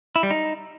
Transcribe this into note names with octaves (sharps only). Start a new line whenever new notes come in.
E4
G3
D#4